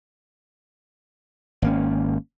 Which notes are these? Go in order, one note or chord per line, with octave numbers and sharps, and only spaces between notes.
G#1 A#3 C#4